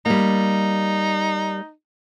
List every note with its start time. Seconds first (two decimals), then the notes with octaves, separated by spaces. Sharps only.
0.06 G3 A#3 D#4